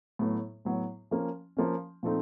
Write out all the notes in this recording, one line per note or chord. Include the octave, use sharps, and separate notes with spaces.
A2 F#3 B3
A2 F#3 B3
F3 A#3 C#4
F3 A#3 C#4
A#2 F3 A3 C4 D#4